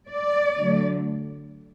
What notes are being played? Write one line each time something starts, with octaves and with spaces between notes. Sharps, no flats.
D5
D3 F#3 A3